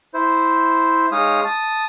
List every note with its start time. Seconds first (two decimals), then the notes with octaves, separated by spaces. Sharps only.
0.14 E4 C5
1.12 G#3 D#4 C#5 F5 D#6
1.45 A5 D#6